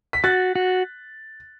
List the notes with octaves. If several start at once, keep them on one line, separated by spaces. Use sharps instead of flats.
B6
F#4 F#6 A6
F#4